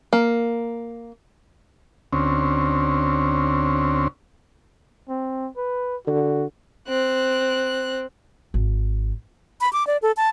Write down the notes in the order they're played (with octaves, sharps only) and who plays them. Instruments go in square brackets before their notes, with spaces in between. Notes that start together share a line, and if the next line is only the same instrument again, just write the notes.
[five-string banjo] A#3
[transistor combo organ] D2 C4 C#4
[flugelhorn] C4
B4
[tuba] D3 [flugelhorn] F#4
[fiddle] C4 F#6
[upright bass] G#1
[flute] B5
D6
D5
A4
A5